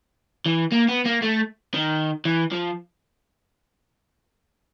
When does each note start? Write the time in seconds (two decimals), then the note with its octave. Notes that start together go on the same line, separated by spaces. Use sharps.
0.46 E3
0.72 A#3
0.89 B3
1.06 A#3
1.22 A3
1.74 D#3
2.25 E3
2.52 F3